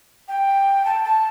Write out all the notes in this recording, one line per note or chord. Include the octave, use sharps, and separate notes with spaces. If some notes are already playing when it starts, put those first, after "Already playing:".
G5
A5
A5